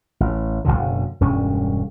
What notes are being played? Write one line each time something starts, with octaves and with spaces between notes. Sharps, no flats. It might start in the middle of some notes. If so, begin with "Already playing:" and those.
A1
F#1 C2 B2 D3
E1 G2 G3 C#4